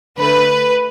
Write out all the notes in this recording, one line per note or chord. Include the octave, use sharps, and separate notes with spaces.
D3 A3 B4